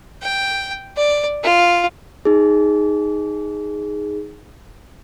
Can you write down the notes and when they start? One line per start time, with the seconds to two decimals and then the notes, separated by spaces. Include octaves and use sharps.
0.22 G5
0.97 D5
1.43 F4
2.25 D#4 G#4